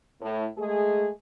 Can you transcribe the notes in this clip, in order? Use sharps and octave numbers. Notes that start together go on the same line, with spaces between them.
A2
G#3 A3 G#4